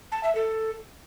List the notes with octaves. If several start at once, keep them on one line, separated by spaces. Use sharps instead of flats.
A5
E5
A4